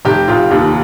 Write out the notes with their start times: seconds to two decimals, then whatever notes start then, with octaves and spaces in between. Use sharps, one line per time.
0.05 F1 G4
0.28 F1 F4
0.51 D#2 G4